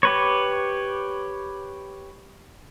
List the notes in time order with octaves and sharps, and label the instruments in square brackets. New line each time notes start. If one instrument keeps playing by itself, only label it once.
[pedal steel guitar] G4 B4 C#5